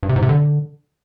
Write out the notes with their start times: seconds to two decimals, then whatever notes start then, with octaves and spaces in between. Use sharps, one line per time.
0.03 G2
0.09 C3
0.16 G#2
0.22 C3
0.29 D3